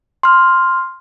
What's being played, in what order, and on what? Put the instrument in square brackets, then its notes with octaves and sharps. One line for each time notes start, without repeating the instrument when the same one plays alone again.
[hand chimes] C6 F6